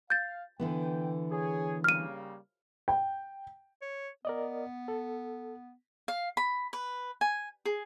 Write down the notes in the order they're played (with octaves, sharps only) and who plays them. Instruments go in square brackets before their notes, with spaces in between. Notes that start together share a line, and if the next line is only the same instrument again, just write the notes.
[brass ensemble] F5 [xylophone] G6 A6
[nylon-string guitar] D3 E3 B3 [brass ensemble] G5
[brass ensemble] G#4 C#5
[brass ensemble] C#3 G3 A#3 [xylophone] F6 D#7
[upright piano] G5
[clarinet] C#5
[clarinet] B3 [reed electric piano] A#4 D5 D#5
[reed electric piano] A4
[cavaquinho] F5
B5
B4
G#5
G#4